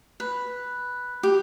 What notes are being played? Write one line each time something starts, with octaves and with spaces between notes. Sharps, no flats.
B4
G4